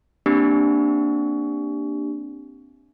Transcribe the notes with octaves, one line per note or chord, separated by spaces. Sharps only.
A#3 C4 D4 G4